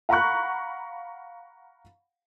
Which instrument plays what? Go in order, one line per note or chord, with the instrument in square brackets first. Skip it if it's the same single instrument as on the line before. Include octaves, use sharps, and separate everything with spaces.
[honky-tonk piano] F5 F#5 A#5 B5 C#6 F#6